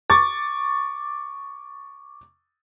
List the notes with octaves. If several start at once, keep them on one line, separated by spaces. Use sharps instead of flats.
C#6 D6 A6